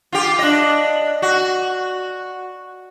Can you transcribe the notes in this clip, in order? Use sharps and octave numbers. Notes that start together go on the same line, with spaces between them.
F4 G4
D4 D#5
F#4